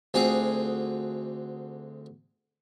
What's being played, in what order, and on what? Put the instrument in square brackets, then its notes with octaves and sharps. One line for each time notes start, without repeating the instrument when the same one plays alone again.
[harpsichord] D2 C4 F4 G#4 G#5